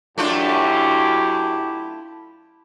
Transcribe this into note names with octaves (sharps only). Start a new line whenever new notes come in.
F#2 A3 D4 E4 F4 G4